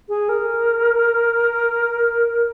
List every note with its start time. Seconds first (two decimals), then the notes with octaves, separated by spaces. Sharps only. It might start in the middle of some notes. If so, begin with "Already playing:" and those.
0.09 G#4
0.29 A#4